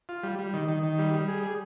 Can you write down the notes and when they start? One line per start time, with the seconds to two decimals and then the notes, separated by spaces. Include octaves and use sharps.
0.09 F4
0.23 G3
0.39 G3
0.54 D#3
0.68 D#3
0.83 D#3
0.98 G3
1.14 G3
1.28 G#4
1.43 G#4